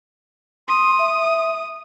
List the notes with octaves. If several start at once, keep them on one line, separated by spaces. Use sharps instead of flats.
C6 D#6
E5